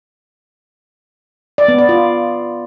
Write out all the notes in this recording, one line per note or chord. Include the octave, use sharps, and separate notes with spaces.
D5
B3
D5
F4